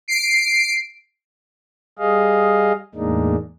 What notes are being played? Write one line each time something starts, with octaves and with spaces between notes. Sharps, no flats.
C7 D7
G3 G#4 D#5 F5
E2 A2 G#3 A#3 D4 D#4